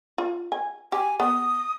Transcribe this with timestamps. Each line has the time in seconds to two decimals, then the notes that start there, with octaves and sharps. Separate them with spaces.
0.18 F4
0.52 G#5
0.92 G4 G#5
1.20 B3 D#6